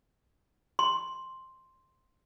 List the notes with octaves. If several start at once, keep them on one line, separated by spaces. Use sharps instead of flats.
C6